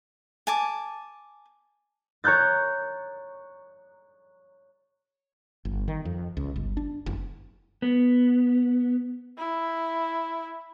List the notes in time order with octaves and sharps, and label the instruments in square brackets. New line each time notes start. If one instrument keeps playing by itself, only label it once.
[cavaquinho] G#5 A5 D6
[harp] C#5 A#5 F#6 G6 A6
[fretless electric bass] G1
D#3
F2
C#2
G1
D4
F#1
[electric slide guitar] B3
[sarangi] E4